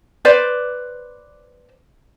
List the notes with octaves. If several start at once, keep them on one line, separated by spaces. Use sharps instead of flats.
B4 C5 D5